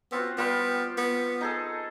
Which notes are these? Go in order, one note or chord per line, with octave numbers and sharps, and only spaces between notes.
B3 C4 F4 F#4
G3 B3 F4 G5
B3
D#4 G#4 A4